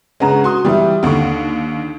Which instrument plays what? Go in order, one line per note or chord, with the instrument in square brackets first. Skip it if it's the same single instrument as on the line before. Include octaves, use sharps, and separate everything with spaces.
[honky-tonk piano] C#3 G#3 [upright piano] B4 F#5 A#5
[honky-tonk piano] F#4 C6 D#6
[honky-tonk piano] E3 G3 [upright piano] G4 E5
[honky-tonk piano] D#2 D3 [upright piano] F#5 C#6